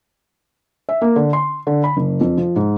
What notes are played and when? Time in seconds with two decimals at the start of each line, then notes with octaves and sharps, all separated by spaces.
0.89 E5
1.02 A#3
1.16 D3
1.33 C6
1.67 D3
1.84 B5
1.97 F#1
2.21 F2
2.37 F3
2.56 G#2